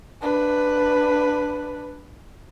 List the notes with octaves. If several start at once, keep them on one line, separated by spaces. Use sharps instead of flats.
D4 B4